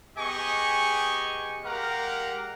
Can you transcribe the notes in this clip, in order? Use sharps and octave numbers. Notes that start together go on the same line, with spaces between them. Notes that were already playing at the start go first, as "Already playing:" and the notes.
B3 G4 G#4 D#5 G#5 C#6
G#3 G4 A#4 F5 F#5 A#5